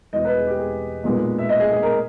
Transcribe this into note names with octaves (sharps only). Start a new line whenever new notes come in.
E1 E2 B2 D#5
B4
G#4
G4
G#4
B1 A#2 G#3 B3
E5
D#5
G#4
G#4
A#4